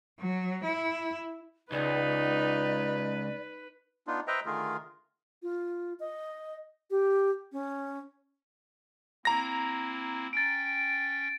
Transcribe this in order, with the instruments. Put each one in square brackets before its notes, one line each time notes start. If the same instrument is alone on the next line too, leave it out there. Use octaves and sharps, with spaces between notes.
[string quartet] F#3
E4
[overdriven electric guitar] C#2 [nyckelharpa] D#4 [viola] B4 [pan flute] D5
[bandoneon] B3 D4 D#4 F4
B4 C5 D#5 E5 G5 A#5
D3 D#3 A3 F4 G#4 A#4
[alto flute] F4
D#5
G4
C#4
[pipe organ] A#3 C4 E4 [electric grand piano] A#5 A#6
[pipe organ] C#4 G5 [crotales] A6 D7